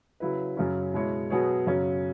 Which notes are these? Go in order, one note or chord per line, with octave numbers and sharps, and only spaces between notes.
C#3 F#3 E4 B4
F#2 C#3 F#3 C#4
B2 G#3 E4 C#5
B2 F#3 B3 G#4 C#5
F#2 C#3 F#3 C#4